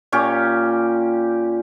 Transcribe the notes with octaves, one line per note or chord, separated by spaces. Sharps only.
A#2 C#4 G4